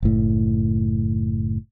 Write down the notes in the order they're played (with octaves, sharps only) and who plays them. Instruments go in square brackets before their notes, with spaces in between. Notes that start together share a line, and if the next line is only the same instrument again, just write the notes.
[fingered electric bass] F#1 A2